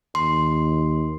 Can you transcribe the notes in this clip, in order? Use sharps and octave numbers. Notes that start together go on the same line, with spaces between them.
D#2 C6